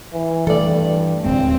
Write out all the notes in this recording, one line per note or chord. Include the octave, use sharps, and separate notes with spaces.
E3
G2 E3 A3 A4 D5
D1 D#2 G#3 C4